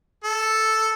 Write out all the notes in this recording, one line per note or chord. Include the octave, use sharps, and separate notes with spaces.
A4